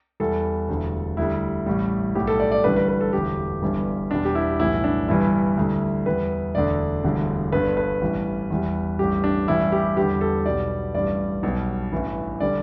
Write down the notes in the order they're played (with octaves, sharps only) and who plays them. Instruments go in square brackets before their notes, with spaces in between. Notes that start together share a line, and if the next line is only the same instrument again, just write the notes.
[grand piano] E2 E3 G3 A4
E1 D2 D3 G3
D2 D3 G3 E4
A1 A2 G3
B1 A2 G3 G4
A4
D5
D5
A1 G2 D3 G3 B4
B4
B4
A4
E1 D2 D3 G4
G1 G2 E3 G3
E2 B2 G3 D4
G4
E4
B1 A2 E3 G3 E4
D4
G1 G2 E3 G3 E4
D2 D3 G3
E2 E3 G3 B4
E1 D2 D3 D5
E1 D2 D3 G3
G1 G2 D3 B4
B4
A1 G2 E3 G3
E2 E3 G3
A1 G2 G3 G4
D4
A1 G2 E3 G3 E4
G4
E2 D3 G3 G4
A4
B1 B2 G3 D5
A1 G2 G3 D5
B1 B2 G3
A1 G2 E3
D3 G3 D5